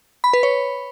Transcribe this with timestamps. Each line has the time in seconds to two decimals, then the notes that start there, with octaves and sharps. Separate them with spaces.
0.24 B5
0.33 B4
0.43 C#5